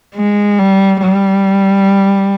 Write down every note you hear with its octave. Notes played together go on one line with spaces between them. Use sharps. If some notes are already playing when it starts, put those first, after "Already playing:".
G#3
G3
G3